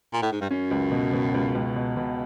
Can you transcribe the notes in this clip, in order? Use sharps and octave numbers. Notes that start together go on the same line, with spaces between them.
A#2
A2
G#2
G2
F#2 C#4
C#2
B2
B2
C#2
C#2
B2
B2